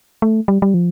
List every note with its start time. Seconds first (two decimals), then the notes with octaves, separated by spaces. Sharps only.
0.22 A3
0.48 G3
0.62 G3
0.74 F3